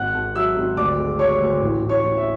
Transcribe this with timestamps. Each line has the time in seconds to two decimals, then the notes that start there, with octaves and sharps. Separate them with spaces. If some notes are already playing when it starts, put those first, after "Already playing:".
Already playing: G#1 F#5 F#6
0.14 G#1
0.35 F#3 E5 E6
0.56 G#1
0.77 D2 D5 D6
0.98 G#3
1.19 G#3 C#5 C#6
1.40 D2
1.61 A1
1.82 A1
1.89 C#5 C#6
2.03 A1
2.17 E5